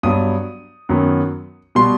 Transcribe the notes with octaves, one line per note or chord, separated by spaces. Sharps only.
G2 F#3 B3 D#6
F#2 D#3 F#3 B3
B2 G3 B3 C6